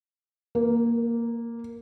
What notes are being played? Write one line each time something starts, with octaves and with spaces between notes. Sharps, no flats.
A#3